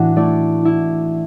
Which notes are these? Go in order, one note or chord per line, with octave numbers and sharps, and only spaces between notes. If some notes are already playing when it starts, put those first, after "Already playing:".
Already playing: A2 E3 D4 F#4
A3 E4 D5
E4